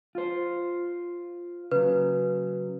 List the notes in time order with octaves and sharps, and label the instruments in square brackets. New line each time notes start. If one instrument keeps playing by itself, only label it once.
[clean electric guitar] F4 C5
[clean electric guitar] C#3 F#3 [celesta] B4